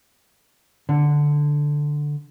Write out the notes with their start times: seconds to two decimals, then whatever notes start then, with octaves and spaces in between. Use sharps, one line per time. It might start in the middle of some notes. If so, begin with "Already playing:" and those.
0.89 D3